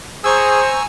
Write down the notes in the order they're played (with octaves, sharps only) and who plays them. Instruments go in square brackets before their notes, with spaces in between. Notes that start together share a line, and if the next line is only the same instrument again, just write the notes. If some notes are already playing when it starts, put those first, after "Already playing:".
[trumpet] G#4 [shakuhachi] C5 [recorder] G#5 [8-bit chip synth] A#5 C#6 E6